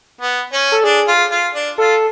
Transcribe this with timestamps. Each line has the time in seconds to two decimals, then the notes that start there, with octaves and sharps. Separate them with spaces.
0.21 B3
0.53 C#4
0.72 A4
0.84 D4 G#4
1.08 F4
1.31 F4
1.54 D4
1.78 F4 A4